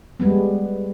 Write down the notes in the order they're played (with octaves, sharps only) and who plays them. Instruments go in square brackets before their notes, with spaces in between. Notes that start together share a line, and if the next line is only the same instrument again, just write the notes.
[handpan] G3 G#3 B3